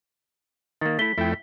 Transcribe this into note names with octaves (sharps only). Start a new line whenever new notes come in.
D#3 A#3 A6
A3 E4 B6 G7
F2 A3 E4 G5